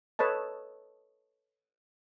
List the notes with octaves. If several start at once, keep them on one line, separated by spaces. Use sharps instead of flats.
A4 B4 C#5 D#5 A5